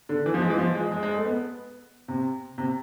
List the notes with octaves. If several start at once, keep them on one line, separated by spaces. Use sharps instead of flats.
D3
E3
F3
G#3
E3
F3
G#3
G#3
G#3
A3
B3
C3
C3